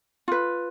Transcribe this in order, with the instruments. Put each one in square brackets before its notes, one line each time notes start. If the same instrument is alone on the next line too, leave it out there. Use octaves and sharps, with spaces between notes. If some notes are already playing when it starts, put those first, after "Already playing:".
[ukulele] F4 B4